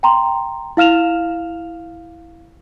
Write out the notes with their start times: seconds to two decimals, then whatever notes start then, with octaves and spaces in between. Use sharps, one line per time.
0.03 G5 A#5 C6
0.77 E4 F5 F6 E7 F7